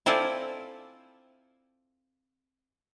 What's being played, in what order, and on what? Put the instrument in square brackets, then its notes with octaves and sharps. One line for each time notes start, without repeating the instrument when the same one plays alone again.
[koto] C4 E4 F4 A4 D5 G#5